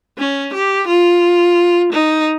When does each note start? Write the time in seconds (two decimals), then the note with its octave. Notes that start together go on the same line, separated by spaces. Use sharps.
0.18 C#4
0.54 G4
0.87 F4
1.93 D#4